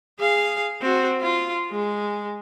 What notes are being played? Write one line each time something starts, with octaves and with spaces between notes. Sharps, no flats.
G#4 F5
C4 F#4
F4
G#3